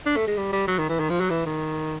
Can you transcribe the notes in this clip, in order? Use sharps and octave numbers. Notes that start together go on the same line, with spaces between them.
D4
A3
G#3
G3
G3
F#3
D#3
E3
D#3
F3
F#3
E3
D#3